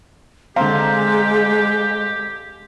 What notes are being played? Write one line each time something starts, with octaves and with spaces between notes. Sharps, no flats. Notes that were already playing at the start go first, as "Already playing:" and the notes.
D3 G#3 C4 G4 F5 A#5